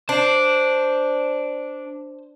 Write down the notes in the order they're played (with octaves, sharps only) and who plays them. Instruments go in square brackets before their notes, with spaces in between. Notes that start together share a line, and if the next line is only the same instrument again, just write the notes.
[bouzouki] D4 [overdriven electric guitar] C5